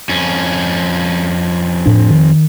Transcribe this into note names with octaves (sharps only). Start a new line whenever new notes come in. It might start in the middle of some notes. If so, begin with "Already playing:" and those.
F2 C#4
A2 D4
D#3